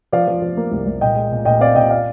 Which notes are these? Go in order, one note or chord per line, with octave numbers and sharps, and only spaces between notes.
F3 D5 F5
F3
F3
A#3
C2
C2
A#2 D#5 G5
G#3
A#2
A#2 D#5 G5
C4 D5 F5
A#2 D#5 G5
D5 F5